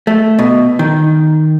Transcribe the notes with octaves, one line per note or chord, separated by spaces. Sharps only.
A3
B2
D#3